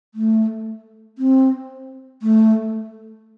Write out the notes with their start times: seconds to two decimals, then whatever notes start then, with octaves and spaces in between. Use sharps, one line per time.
0.15 A3
1.18 C4
2.22 A3